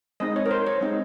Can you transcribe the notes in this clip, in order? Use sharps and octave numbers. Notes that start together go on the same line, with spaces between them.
G#3 C4 D#4 D#5
C#5
A#4
C5
C#5
G#3 C4 D#4